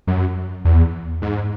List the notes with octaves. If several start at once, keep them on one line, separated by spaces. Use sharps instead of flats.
F#2
E2
G#2